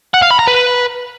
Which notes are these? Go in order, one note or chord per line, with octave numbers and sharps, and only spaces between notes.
F#5
F5
B5
A#5
B4